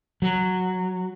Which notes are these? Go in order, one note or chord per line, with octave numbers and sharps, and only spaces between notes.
F#3